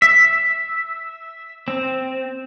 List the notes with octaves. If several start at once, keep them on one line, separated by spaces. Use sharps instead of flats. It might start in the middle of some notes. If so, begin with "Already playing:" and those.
E5
C4